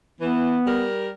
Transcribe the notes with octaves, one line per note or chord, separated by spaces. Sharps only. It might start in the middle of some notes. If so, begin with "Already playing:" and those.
E3 B3
G3 A#4